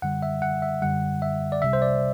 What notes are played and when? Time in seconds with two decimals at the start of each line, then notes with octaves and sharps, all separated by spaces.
0.02 F#2 D3 G3 F#5
0.22 E5
0.42 F#5
0.62 E5
0.82 F#2 D3 G3 F#5
1.22 E5
1.52 D5
1.61 C2 C3 G3 E5
1.73 C5
1.82 D5